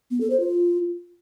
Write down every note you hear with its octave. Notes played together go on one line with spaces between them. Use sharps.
B3
A4
C5
F4